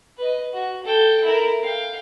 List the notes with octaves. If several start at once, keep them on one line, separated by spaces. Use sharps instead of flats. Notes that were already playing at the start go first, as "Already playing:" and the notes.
B4 D#5
F#4
A4 G5
E4 A#4
F5 G5